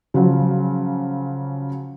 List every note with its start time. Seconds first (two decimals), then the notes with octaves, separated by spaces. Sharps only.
0.14 C#3 F3 F#3